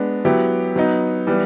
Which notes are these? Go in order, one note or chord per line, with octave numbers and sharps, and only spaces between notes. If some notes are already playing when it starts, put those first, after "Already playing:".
Already playing: G#3 B3 D4
F#3 B3 E4 G4
F#3 B3 D#4
E3 G3 B3